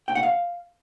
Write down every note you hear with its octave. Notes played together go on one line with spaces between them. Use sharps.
G5
F#5
F5